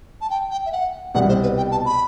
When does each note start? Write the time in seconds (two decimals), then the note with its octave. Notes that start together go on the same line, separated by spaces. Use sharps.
0.21 A5
0.30 G5
0.51 G5
0.66 E5
0.72 F#5
1.14 C2 B2 G3 F#5
1.29 C5
1.43 B4
1.57 G5
1.71 A5
1.85 B5